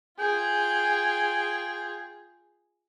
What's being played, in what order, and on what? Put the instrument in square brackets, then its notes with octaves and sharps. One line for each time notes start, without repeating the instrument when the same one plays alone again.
[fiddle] F4 G#4 [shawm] G5